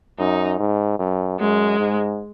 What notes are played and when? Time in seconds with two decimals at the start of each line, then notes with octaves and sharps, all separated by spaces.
0.19 F#2 D#4
0.59 G#2
0.99 F#2
1.39 F#2 G#3
1.79 G#2